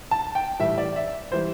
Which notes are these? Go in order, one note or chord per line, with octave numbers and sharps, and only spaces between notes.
A5
G5
A2 E3 G3 E5
D5
E5
E3 G3 C5